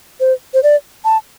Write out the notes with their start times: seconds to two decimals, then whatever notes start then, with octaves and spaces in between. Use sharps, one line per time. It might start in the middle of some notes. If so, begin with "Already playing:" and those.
0.20 C5
0.54 C5
0.63 D5
1.05 A5